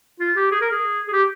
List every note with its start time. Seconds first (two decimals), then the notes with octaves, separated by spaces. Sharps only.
0.20 F4
0.36 G4
0.52 G#4
0.61 A#4
0.71 G#4
1.08 G#4
1.12 G4